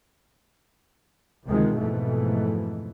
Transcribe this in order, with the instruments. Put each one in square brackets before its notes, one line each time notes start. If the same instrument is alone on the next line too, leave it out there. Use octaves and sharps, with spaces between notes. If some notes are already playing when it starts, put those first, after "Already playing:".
[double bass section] D2 C3 D#3 F3 G#3
F2 G#2 B2 E3 A3